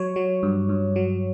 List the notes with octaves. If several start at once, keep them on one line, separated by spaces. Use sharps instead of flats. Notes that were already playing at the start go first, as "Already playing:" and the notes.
Already playing: F#3 C#5
F#3
G2
G2
F#3